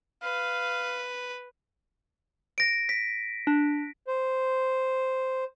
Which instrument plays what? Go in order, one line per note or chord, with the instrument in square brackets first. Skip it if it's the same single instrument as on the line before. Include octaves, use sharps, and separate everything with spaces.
[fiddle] B4 [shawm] F5
[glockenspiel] A#6 D7
B6
[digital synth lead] D4
[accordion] C5